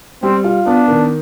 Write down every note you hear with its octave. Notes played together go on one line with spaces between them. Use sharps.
G3 C4
F4
B3 D4
D#3